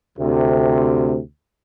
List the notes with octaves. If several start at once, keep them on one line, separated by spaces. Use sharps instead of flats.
D2 C3